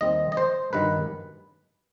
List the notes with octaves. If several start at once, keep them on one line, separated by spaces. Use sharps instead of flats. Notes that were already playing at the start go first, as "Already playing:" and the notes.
D#2 D#3 G3 C4 D#5
D#5
C5
G2 D#3 F#3 B4